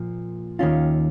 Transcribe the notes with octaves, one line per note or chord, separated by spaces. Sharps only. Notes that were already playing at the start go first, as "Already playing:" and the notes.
Already playing: A#2 F3
D#2 D#3 C#4 F4